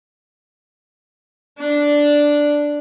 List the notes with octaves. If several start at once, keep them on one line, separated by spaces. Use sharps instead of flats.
D4